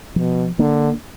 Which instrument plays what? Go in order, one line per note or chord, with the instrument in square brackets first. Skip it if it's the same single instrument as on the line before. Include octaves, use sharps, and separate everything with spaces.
[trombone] B2 [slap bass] F3
[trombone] D3 [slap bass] A#3 D4